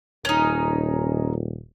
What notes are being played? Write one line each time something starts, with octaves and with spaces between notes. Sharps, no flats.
D#1 C#4 D#4